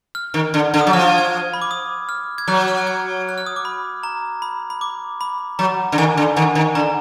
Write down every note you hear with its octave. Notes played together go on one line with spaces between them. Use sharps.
F6
D#3
D3
D3
D#6
F#3
F3 F6
G#6
B5
D6
D#6
F6
G#6
F#3 F#6
F6
F#6
G#6
F#6
F6
D#6
D6
B5
A#5
B5
B5
D6
B5
F#3 A#5
D3
D#3 G#5
D3
D#3 G#5
D#3
D3 A#5